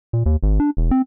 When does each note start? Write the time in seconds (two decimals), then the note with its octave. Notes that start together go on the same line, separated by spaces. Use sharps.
0.13 A#2
0.26 D#2
0.43 G#1
0.60 D4
0.77 E1
0.91 C4